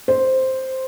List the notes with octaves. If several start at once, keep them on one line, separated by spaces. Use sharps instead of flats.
C5